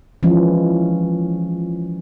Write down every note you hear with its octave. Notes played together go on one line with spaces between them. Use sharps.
E3 F3 G#3 C#4